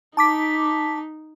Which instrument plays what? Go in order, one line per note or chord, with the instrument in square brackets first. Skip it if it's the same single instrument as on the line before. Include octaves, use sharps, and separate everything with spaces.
[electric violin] D#4 [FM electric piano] A5 D6 B6